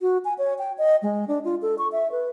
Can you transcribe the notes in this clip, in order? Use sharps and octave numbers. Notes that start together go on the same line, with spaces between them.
F#4
G#5
C#5
G5
D#5
G#3
D4
F4
A4
C#6
E5
B4